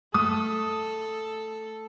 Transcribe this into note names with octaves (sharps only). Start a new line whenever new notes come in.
A3 A4 D#6